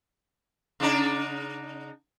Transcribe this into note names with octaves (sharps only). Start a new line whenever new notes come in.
C#3 D4 D#4